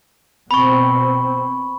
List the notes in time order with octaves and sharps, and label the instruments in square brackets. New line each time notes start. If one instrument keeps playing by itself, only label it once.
[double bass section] B2 C4 [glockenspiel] B5 C#6